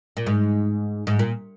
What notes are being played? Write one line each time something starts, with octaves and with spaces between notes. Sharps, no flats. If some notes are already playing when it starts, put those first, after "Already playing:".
A#2
G#2
G#2
A#2